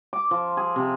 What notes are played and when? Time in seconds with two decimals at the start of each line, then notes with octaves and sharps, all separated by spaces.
0.13 D6
0.31 F3
0.57 G#4
0.76 C3